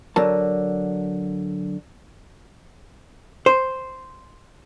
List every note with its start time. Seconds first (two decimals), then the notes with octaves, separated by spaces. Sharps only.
0.16 D3 F#3 A#4 A5
3.46 C5